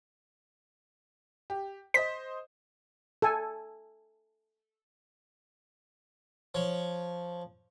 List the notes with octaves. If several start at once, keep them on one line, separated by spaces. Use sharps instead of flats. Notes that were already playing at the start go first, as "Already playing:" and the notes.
G4
C5 D#5 B6
A4 G#5
F3 C#5